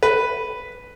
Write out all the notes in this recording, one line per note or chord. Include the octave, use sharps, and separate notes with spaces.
B4